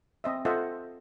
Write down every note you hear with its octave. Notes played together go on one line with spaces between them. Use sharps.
C4 D#5 E5
F4 A4 C5 D#5 E5 F#5